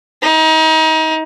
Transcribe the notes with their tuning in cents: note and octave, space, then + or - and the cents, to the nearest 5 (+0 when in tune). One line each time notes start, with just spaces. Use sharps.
D#4 +30